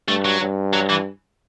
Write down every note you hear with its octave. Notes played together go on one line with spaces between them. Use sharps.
G2 A3
F#3
G2
F#3
E3